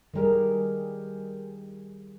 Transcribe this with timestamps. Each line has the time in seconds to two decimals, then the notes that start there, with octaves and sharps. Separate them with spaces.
0.14 D#3 G3 G#3 G4 G#4 A#4